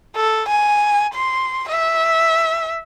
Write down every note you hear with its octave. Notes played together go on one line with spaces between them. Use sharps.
A4
G#5
C6
E5